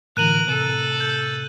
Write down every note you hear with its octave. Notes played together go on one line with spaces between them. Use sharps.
A2 D3 E3 A#4 F#6 D#7 F#7
A2 C3 A4
G6